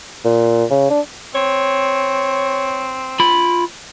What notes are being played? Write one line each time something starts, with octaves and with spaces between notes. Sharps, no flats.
A#2
C#3
D4
C4 C#5
F4 B5